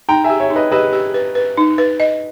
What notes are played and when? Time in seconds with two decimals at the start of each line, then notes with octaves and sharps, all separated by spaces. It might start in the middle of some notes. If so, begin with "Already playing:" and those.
0.09 D#4 G5 A#5
0.24 E5 G#5
0.30 G4
0.40 C#5 E5
0.50 D#4
0.55 B4 D#5
0.72 G4 B4 D#5
0.93 G4
1.14 B4
1.35 B4
1.57 D#4
1.78 B4
2.00 D#5